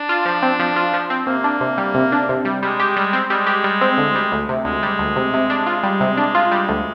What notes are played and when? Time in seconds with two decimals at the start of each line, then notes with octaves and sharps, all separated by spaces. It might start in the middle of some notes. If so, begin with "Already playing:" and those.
Already playing: D4
0.09 F4
0.25 F3
0.42 C4
0.59 F3
0.76 F4
0.94 F3
1.10 C4
1.27 C3 A#3
1.44 D4
1.61 C3
1.78 G3
1.95 C3
2.12 D4
2.29 C3
2.45 G3
2.63 G3 G#3
2.80 G4
2.97 G3
3.13 C4
3.30 G3 G#3
3.47 G4
3.64 G3
3.81 C4
3.98 D2
4.15 G3
4.32 D2
4.49 C3
4.65 D2 G#3
4.83 G3
4.99 D2
5.16 C3
5.34 C3
5.50 D4
5.67 F4
5.83 G3
6.00 C3
6.17 D4
6.35 F4
6.52 G3
6.69 D2